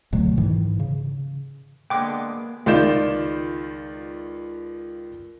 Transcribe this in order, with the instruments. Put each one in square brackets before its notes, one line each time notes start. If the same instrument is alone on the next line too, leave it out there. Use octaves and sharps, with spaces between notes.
[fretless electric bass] D2 B2 F#3 A3
G#2 D#3 E3
C#3
[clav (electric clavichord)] D3 G#3 B3 [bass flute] A#3 [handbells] G5 D6
[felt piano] C#2 D#3 F4 D5 G6 E7